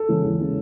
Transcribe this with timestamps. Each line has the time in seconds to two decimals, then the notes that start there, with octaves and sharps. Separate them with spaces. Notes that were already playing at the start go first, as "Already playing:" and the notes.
Already playing: A4
0.09 C#3 E3 G#3
0.24 E2
0.39 C#3 E3 G#3